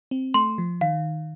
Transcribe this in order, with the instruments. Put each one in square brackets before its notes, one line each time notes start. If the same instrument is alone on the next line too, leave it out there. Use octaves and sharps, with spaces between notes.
[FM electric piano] C4
[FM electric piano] A3 [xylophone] C6
[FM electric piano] F3
[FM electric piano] D#3 [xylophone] F5